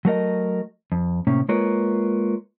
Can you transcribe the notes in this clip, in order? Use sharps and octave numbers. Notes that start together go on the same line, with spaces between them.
F#3 A3 A#4 D#5
F2
A2 C3 A#3 C#4
G#3 A#3 F4 A#4 B4 C#5